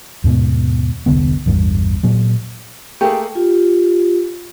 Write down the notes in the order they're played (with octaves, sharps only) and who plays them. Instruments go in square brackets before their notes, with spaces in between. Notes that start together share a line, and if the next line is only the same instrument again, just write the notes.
[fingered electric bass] D#2 G#2 B2 B3
E1 C2 D3 B3
A1 E2 G2 G3
A#2 F#3
[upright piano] A3 A#3 G#4 [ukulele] D#4 G4
[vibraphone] F4 G4